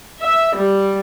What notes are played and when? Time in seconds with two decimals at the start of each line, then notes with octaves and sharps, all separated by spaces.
0.20 E5
0.56 G3